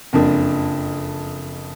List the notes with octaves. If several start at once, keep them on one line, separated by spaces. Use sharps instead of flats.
F#1 F2 D4